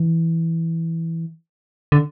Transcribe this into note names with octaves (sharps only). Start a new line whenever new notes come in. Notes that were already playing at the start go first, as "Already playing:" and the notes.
Already playing: E3
D3